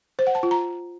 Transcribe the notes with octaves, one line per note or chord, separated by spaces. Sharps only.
C5
F#5
A5
F4
A#5